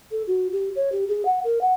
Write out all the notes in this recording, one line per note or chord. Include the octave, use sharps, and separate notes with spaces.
A4
F#4
G4
C#5
G4
G#4
F#5
A#4
F#5